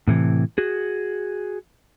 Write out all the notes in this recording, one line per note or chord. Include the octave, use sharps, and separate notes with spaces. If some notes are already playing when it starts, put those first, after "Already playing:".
A2 C3 E3
F#4 G#4